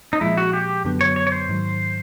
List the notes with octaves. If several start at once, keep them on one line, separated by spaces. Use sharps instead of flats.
D#4
A#2 F3 G#3 E4
F#4
G4
F#2 D3 F#3 B3
C#5
C#5
C#5
C5
G#2 D#3 F#3